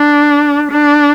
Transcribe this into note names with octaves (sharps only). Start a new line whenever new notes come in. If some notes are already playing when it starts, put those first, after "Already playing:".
Already playing: D4
D4